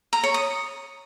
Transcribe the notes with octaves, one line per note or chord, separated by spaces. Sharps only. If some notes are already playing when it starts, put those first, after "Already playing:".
A#5
C#5
D#6